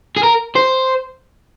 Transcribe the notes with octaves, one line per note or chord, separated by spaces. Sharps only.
G#4
A#4
C5